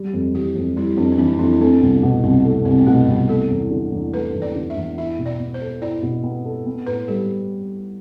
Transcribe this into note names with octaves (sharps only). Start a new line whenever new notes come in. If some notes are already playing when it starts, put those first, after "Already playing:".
Already playing: G3
F2
E3 G4
F2
G3 E4
F2 D4
C4
E3 D4
D4
F2 E4
D4
A3 C4
C2 B3
B2
C2 C4
A3
C2 C4
B3
B2 A3
C2 B3
A3 A4
E2
D3
E2
A3 B4
E2
D5
D3
E5
E2
E4 E5
B2
D5
B3
C5
A4
E4 D5
B2
B3
A4
B3
A2 B4
G3 A4